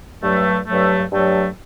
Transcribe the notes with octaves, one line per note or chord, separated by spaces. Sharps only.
G2 F#3 A3
G2 F#3 A3
G2 F#3 A3